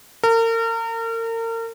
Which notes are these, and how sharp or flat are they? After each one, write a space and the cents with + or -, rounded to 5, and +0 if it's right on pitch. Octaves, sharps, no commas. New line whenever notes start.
A#4 -35